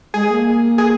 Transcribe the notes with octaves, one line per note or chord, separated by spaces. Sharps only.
G#3 G#4
G#3
A#3
G#4